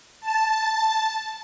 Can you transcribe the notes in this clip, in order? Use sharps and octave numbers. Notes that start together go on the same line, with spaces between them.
A5